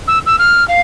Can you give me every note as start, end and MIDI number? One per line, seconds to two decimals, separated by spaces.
0.07 0.19 88
0.26 0.36 88
0.38 0.66 89
0.68 0.81 77